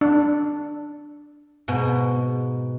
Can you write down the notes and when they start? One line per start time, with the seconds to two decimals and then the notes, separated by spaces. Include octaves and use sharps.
0.01 D4
1.68 G#2 B2